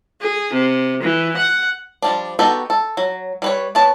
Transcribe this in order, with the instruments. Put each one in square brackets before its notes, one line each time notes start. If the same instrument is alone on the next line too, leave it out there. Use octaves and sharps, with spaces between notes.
[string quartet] G#4
C3
E3
F#5
[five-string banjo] F3 G3 D4
B3 D#4 F#4 G4 A4
A4
F#3
G3 B4 C#5
B3 C#5 A5